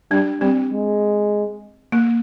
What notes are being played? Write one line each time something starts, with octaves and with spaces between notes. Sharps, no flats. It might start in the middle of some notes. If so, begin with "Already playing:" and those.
G3 D4
G3 C4
G#3
A#3